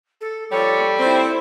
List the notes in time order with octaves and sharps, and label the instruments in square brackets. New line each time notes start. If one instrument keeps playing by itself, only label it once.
[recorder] A4
[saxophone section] F3 C#5 [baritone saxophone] G3 [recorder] A4 [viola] D5
[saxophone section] C4 [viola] E4 C5